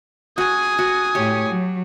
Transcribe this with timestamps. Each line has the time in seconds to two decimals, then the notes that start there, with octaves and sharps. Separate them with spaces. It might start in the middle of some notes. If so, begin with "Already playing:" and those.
0.38 F#4 G#5 D#6
0.79 F#4
1.15 A2 G4 C#5
1.49 F#3